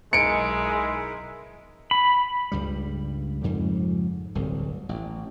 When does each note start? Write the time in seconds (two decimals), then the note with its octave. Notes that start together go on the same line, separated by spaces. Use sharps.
0.13 B1 G#3 D#4 E4 A#4 C#7 D7
1.91 B5
2.52 C#2 G2 G3
3.43 F2 G#2 C#3 G3
4.35 D1 G1 C2
4.89 A1